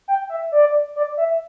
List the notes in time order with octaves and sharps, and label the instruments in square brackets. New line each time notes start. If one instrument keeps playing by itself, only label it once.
[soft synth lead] G5
E5
D5
D5
E5